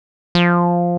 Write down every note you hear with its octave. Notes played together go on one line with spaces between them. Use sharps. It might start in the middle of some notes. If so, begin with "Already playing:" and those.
F3